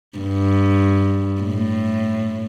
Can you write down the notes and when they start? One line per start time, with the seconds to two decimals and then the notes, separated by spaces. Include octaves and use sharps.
0.19 G2
1.41 A2